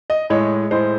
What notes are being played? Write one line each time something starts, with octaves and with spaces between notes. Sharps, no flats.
D#5
A2 G#3 C#5
A2 G#3 C5